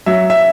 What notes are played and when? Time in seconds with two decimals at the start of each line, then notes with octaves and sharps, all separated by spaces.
0.06 F#3 E5
0.30 E5